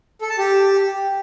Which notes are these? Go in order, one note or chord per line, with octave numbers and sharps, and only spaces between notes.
A4
A5
G4